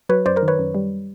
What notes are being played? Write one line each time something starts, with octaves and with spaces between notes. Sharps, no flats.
F#3 B4 C#5
F#2 C5 D5
A#4 C5
D#3
B4 C#5
F#2
G3